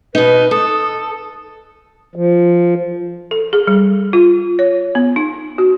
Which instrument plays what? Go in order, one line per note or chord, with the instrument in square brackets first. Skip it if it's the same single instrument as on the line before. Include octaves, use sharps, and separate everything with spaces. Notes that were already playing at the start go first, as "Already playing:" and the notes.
[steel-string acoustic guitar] B2 D#4 [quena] B4
[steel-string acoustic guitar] A4 [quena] D#6
[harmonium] F3
[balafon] A4
G#4
G3
F4
C#5
B3
D#4
F#4